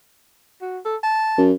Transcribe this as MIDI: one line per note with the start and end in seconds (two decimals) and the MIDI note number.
0.62 0.79 66
0.85 0.96 69
1.03 1.44 81
1.38 1.52 42